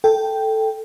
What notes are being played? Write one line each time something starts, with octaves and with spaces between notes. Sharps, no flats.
A4 G5